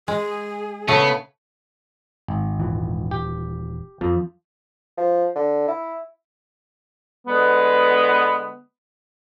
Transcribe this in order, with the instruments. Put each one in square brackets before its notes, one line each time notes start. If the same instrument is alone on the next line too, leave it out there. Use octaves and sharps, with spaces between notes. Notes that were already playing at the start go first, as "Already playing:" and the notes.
[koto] G#3 [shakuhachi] G#4
[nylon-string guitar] C#3 [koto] A3 [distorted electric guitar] B3
[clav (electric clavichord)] G#1
[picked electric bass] D#1 E3
[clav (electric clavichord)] G4
[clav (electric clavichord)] F2 [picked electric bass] F3
[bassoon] F3
D3
E4
[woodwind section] D3 G#3 B3